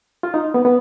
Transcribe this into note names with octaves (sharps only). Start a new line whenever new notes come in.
F4
D#4
B3
B3